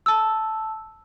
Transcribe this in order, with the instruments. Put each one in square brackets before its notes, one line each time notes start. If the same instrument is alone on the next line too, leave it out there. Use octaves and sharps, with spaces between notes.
[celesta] A5 E6